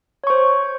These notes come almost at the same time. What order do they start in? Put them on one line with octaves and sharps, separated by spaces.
C#5 C#6 C5